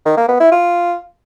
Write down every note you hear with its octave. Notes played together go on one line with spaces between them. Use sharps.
D#3
A#3
B3
E4
F4